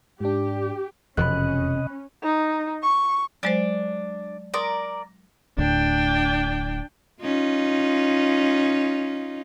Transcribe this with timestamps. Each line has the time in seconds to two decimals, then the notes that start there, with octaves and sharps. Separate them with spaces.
0.21 G#2 D4 G4
1.17 E1 F2 C3 F3 C#4 D#5 B5 F#6
2.23 D#4
2.82 C#6
3.43 F#3 G#3 D4 C5
4.54 A#4 D5 A#5 C6 D#6
5.58 D1 D2 A2 D4 G5
7.22 C#4 D#4 F4